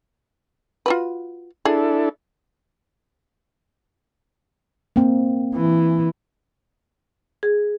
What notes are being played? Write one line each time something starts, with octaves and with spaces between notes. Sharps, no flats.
F4 F#4 B4
D4 E4 G#4 A4
A#3 C4
E3
G#4